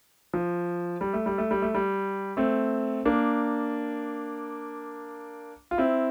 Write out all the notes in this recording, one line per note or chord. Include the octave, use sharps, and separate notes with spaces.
F3
G3
A3
G3
A3
G3
A3
G3
A3 C4
A#3 D4
F4
C4 E4